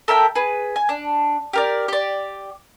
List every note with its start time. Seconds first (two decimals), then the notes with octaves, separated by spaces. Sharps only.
0.08 A4 A#4 E5 G5
0.35 G#4 B4
0.76 G#5
0.89 D4
1.53 G4 A#4 D5
1.88 G4 D5